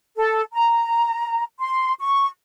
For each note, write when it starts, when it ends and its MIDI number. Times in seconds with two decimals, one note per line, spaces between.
0.17 0.41 69
0.52 1.42 82
1.60 1.92 84
2.00 2.27 85